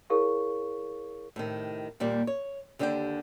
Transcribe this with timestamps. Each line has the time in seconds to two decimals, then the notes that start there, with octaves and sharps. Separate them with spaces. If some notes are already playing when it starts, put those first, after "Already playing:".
0.10 E4 G#4 A#4 C#5 F5 C#6
1.36 A2 C3 D#3
2.00 D#2 A#2 G3 A#3
2.27 C#5
2.79 D#2 D3 D4 G4 A#4 G5